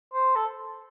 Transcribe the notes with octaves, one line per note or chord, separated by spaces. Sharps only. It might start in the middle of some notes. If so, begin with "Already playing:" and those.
C5
A4